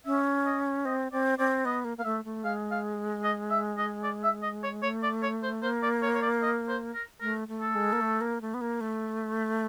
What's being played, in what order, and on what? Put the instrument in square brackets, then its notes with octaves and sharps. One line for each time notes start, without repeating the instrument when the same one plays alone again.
[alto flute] C#4 [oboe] E5
[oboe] D#5
[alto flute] C4 [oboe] D#5
[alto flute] C4 [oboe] D5
[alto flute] C4 [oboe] D5
[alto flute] B3 [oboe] D#5
[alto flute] A#3
[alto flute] A#3 [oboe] F5
[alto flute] A3 [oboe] E5
[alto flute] A3
[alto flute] G#3 [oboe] F5
[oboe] F5
D#5
E5
D#5
D5
E5
D#5
C#5
[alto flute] A3 [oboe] C#5
[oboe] D5
C#5
C5
[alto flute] A#3 [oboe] C5
[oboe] D5
C#5
C#5
D5
D#5
C5
A#4
[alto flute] A3 [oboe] A#4
[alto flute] A3
[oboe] A4
[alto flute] G#3
A#3
A3
A#3
A3
B3
A#3
A3